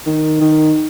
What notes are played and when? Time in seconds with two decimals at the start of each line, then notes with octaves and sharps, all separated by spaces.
0.06 D#3
0.41 D#3